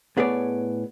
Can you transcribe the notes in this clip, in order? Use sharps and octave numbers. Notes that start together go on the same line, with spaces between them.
A2 B3 G#4 C#5 D5